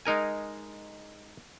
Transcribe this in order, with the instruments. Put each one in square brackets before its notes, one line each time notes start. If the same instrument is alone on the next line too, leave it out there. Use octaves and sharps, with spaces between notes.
[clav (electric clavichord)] G#3 D#4 A#4 G#5